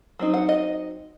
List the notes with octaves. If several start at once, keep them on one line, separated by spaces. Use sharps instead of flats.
F#3 C4 D#4
F#5
D#5